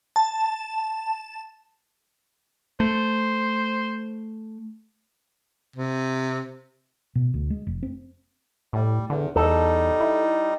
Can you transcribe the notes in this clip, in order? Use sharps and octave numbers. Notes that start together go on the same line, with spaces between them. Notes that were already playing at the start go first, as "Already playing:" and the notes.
A5
A3 C5
C3
B2
D2
G#3
F1
C4
A2 G3
E2 D3
E2 G3 D#4 A4
E4